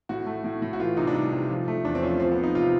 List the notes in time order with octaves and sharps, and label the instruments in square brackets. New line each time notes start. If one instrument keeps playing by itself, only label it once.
[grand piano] A2 F#4
A3
A2
A2
F#4
E3 F4
C3 D#4
D4
G3 D#4
C3
F3
A3
E2 D4
C4
F3 C#4
F3 C4
B3
F3
D#4
C3 F4